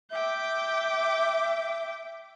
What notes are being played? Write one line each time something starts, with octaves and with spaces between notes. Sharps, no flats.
E5 G5 D6